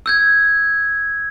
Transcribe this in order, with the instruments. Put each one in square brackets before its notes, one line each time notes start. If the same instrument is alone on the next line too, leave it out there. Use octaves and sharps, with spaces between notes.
[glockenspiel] E6 G6 G#6